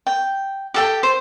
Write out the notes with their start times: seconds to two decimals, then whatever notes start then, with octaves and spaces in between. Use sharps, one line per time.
0.07 G5
0.74 G4 A4 G5
1.03 C5